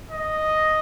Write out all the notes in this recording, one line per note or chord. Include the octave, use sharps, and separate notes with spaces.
D#5